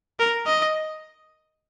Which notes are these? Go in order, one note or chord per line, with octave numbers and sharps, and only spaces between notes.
A#4
D#5